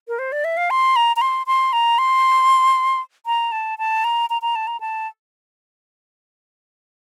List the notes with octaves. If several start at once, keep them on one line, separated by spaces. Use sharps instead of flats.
A#4
C5
D5
E5
F5
C6
A#5
A#5
C6
C6
A#5
C6
A#5
A5
A5
A#5
A#5
A#5
A5
A#5
A5